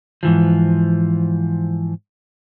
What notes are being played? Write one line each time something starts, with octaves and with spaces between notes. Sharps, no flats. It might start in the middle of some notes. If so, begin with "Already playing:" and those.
G#2 E3 F3